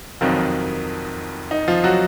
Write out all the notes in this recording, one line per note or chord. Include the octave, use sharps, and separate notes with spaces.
F1 F2 D#3 F3 F#3 F4
D#4
F3 F4
F#3 F#4